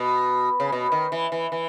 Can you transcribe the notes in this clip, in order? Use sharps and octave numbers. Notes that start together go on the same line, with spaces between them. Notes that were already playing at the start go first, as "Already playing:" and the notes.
Already playing: B2
C#3
B2
D#3
E3
E3
E3